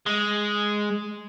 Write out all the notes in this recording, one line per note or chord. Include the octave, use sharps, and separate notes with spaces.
G#3